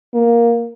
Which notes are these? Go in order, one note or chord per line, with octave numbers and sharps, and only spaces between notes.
A#3